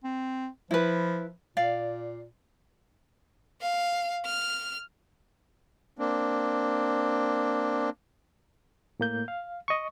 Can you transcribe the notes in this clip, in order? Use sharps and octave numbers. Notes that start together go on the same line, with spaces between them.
C4
F3 E4 B4
A#2 D5 F5
F5
F6
A#3 C4 D4
A2 A#3 G6
F5
D#5 C#6